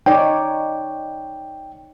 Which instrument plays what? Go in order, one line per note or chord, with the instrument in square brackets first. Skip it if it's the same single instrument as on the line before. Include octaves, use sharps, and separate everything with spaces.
[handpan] D#4 C#5 D5 [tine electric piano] G5